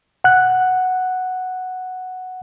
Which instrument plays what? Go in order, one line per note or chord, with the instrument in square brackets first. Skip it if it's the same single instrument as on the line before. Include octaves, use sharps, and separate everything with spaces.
[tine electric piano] F#5 F#6